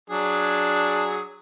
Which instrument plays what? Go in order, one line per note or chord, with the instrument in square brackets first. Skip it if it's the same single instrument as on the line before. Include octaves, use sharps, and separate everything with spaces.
[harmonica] F#3 D4 G#4